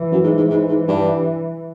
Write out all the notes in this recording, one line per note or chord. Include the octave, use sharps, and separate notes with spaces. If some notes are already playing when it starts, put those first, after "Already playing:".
Already playing: E3
F#2
G#2
G#2
G#2 E3
G#2
G2